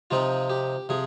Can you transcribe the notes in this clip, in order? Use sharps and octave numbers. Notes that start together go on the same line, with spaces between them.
C3 F3 C4 D#4 F4
G4
C3 F3 G#4